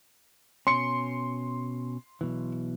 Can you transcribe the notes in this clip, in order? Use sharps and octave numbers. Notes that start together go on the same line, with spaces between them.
B2 C#4 C6 C#7
B1 B2 E3